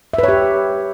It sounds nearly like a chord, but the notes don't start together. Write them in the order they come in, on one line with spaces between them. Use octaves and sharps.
E5 B4 C#5 G4